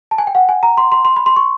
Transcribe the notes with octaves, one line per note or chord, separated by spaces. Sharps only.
A5
G#5
G5
F#5
G#5
A#5
C6
C6
C6
B5
C6
C#6